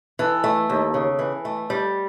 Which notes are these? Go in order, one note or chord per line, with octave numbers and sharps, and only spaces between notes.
E3 A4
A3
D#2
C#3
E3
A3
G3